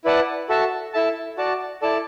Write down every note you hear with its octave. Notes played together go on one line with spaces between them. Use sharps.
E4 B4 D5 F#5 A5
F#4 A4 E5 A5
E4 A4 E5 A5
F#4 D5 A5
E4 A4 D5 A5